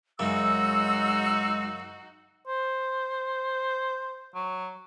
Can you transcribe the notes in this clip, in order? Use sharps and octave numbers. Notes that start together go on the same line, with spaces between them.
F#2 C#3 G#3 D#4 F#4 E6
C5
F#3